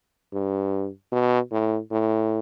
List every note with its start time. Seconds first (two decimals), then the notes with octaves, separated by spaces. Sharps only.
0.33 G2
1.12 B2
1.51 A2
1.91 A2